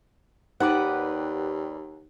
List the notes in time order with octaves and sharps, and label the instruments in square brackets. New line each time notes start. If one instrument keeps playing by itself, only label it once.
[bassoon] D#2 [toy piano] D#4 C5 [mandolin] G4 B4 D5 [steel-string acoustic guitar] F#5